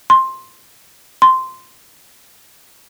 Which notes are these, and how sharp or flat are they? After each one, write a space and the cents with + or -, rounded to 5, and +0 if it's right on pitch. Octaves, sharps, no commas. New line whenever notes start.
C6 +10
C6 -10